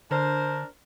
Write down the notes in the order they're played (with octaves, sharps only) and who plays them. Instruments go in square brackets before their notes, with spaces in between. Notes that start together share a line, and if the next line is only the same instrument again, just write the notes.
[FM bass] D3 [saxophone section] D4 A#4 C5